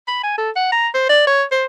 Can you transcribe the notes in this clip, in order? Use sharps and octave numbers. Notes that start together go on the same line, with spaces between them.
B5
G#5
A4
F#5
A#5
C5
D5
C#5
C5